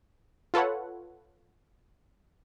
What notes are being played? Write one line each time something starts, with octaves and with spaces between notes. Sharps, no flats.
F4 A4 B4 C#5 F#5